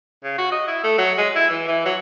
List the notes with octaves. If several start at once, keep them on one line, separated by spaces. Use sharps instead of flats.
C#3
F#4
D#5
E4
A3
F#3
G#3
E4
E3
E3
F#3